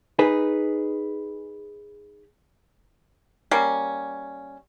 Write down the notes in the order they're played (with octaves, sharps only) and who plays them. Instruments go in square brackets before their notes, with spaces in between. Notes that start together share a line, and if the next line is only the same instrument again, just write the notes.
[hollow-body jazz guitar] D#4 G#4 B4
[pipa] G3 A#3 C#4